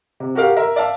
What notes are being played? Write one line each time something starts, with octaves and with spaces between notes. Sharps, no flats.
C3
F#4 G4 A#4 F5
A#4 E5 A#5
D5 E5 F5 A5